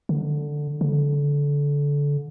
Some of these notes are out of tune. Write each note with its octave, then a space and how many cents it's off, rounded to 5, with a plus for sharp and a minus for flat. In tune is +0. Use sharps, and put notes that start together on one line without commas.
D3 +5
D3 -25